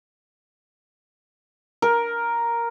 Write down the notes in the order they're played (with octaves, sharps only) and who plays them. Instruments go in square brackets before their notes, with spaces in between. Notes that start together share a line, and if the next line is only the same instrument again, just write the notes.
[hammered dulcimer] A#4